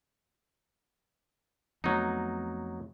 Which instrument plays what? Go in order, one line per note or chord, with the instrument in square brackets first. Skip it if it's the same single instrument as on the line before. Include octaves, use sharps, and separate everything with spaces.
[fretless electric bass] F2 A3 B3 [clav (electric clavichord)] F#3 D#4